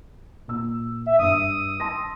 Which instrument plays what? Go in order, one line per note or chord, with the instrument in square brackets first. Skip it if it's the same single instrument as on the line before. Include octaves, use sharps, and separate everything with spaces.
[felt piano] A#2 E6
[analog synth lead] E5
[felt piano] G2 E6 [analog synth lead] D#6
[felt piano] A5 C6 A#6